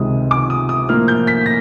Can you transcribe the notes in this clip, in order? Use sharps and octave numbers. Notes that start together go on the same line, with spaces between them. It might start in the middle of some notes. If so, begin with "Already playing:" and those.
Already playing: C#2 C3 D#3 G#3 D#6
D6
D#6
D#6
A2 F3 A#3 F6
G6
B6
A#6